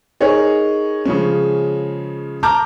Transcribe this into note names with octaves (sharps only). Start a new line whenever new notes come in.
D#4 G#4 A#4 C#5 D#5
C#3 F3 G#3 C#4
A5 A#5 D6 F6 G6